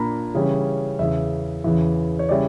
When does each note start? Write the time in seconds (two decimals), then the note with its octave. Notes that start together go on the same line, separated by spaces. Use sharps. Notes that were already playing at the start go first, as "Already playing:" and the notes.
Already playing: A#2 A#3 D4 A#5 B5
0.34 C#3 E3 G3 C#4
0.99 E2 C#3 E3 E5
1.64 E2 C#3 E3
2.19 C#5
2.29 C#3 G3 C#4 E4 D5